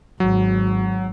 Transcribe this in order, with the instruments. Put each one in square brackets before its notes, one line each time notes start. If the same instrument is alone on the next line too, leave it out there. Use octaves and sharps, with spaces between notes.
[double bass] G#1 [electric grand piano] F#3